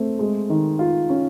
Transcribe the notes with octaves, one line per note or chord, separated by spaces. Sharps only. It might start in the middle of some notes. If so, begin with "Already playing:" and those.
Already playing: A3 C4
G#3
D#3
F4
C#4